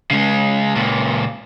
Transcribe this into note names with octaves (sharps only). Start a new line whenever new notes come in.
C#3 G#3
C#2 A#2